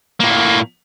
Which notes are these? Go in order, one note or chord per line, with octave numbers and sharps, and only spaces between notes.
A2 A#3